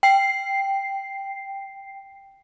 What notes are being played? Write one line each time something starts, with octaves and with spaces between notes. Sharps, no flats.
G5 C7